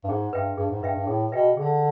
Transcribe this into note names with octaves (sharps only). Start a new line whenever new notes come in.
G2
G#2 G#4
G2 B4 E5 G5
G2 G#4
G#2
G2 B4 E5 G5
G2
A2 G#4
B2 B4 E5 G5
D3 G#4